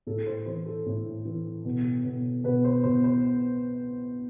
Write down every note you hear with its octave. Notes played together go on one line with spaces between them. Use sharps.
A2 A4
C5
E3 C5
A4
A2
E3
B2
B2
B2 B4
C5
B2 C5
C5